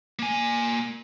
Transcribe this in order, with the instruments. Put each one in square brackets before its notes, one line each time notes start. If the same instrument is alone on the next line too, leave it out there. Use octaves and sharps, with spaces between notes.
[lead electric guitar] A#3 G#5